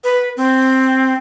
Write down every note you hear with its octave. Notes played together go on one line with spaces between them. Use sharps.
B4
C4